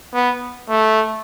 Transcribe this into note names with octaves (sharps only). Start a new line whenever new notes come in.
B3
A3